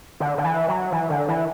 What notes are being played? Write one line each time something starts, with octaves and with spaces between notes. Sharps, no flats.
D3
D3
E3
F#3
E3
D3
E3